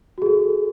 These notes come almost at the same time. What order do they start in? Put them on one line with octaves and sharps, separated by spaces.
F#4 G#4 A4